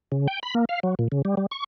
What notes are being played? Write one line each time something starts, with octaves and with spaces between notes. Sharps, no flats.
C#3
G5
B5
A#3
F5
F#3
A#2
C#3
G3
G3
C#6